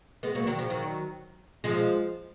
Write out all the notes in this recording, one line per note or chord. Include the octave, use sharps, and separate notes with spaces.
G#3 B3
F#3 A#3
D#3 F#3
C#3 F3
D#3 F#3
F3 G#3